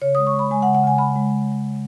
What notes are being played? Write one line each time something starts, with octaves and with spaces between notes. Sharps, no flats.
C#3 C#5
D#6
G#3
C#6
G#3
B5
G#3 G#5
F#5
C#3
F#5
C#3 G#5
C#3 B5
G#3